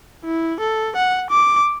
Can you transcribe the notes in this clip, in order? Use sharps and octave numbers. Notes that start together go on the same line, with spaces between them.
E4
A4
F#5
D6